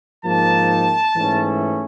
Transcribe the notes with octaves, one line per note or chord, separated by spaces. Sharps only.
G#2 F3 A#3 D#4 A5
G#2 E3 A3 C#4